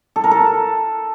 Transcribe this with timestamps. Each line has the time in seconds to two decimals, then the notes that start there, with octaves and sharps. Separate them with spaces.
0.16 A4
0.24 A#4
0.31 A4